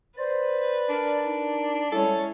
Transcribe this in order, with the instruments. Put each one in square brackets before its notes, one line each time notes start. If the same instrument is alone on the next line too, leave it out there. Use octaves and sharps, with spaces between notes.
[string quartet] B4 [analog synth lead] C5 [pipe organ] D5
[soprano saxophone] D4 [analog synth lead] A#4
[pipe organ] D#4
[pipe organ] G3 [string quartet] G#3 C#4 C#5 [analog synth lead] E4 [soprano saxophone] A4